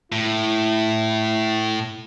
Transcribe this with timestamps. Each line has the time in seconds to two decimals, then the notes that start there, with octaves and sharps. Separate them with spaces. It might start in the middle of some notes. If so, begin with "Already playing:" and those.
0.12 A2 E4